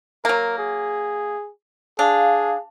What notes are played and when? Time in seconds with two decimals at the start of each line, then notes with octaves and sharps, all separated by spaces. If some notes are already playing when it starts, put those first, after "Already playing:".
0.25 F#3 A#3 A#4
0.58 G#4
1.99 D4 G#4 F5